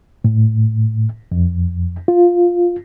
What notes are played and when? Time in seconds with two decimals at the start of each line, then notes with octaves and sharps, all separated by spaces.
0.24 A2
1.32 F2
2.08 F4